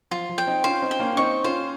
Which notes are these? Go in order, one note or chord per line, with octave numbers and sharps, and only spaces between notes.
F3 F4
F3
G5
C4 D#4
C#4 F4 C5
C4 D#4
G5
A#3 C#4
C#4
C4 D#4 C#6
C#4 F4 C5